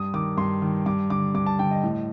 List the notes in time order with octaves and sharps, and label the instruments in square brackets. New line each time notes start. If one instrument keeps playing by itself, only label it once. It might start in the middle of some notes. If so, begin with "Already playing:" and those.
Already playing: [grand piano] G2 D#6
D#3 D6
G2 C6
D#3
G2 D6
D3 D6
G2 D6
A5
D3 G5
D#5
A2